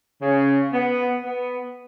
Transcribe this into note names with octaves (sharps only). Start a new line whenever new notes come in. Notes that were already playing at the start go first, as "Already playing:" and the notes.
C#3
B3
B3